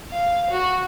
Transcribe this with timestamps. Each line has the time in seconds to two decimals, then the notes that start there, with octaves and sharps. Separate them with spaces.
0.10 F5
0.50 F#4